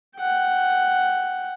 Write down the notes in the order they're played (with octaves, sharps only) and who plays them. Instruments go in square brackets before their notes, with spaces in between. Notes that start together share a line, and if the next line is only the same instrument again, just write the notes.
[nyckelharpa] F#5 G5